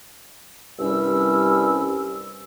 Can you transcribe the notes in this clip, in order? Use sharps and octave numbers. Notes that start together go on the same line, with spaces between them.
C2 G2 G3 C#4 E6